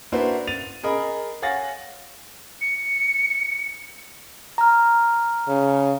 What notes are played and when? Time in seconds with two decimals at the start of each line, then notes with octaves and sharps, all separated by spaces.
0.12 A#3 D4 E4 F#4 B4 C5
0.47 A6 D#7 F7
0.83 G#4 A#4 D#5 B5
1.42 C#5 F5 F#5 G#5 A6 A#6
2.61 C#7
4.58 A#5 F6
5.48 C#3